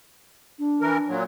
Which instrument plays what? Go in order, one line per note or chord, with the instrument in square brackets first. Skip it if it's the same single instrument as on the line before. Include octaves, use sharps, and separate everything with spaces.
[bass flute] D4
[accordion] E3 A#4
A#2 F#3